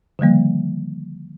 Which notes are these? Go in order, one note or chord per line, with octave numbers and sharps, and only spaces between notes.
D3 D#3 F3 G3 A#3